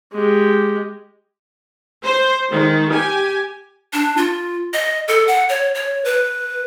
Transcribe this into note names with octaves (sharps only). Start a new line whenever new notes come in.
G#3 G4
C5
D#3 G#3
G4 G#5
D4
F4
D#5
A4
F#5
C#5
C#5
B4